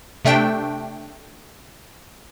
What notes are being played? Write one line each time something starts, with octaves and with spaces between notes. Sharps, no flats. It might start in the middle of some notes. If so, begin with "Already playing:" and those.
C3 A3 D4 G5